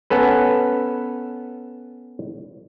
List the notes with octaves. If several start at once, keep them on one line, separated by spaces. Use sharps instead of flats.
B3 C#4 A4 B4